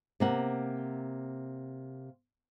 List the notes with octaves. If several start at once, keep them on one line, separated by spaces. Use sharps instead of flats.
C3 A#3 F#5